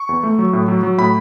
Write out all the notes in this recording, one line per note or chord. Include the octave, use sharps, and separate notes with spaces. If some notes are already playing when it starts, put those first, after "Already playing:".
Already playing: C#6
E2
A3
F#3
A2
F#3
F#3
A2 B5